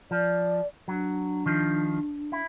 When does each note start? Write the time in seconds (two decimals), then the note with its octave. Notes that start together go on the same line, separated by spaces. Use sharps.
0.11 F3 D5
0.88 F#3 D4
1.46 D#3 F3
2.32 E4